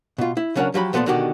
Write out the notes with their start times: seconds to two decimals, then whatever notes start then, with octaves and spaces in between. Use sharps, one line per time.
0.18 B2 F4
0.37 E4
0.55 C#3 F#3 C#4 D4 A#4 F#5
0.74 F3 F#3 G4 B5
0.93 A#2 F3 B3 A4 D5 C6
1.06 B2 D3 D#3 F#4 G4